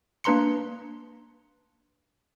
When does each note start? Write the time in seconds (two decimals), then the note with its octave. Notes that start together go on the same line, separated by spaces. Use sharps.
0.24 A#3 D4 B4 A#5 C6 C#7